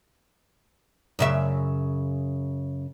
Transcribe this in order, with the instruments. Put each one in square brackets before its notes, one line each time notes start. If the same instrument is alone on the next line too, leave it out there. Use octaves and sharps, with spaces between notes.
[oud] F#2 C#3 E5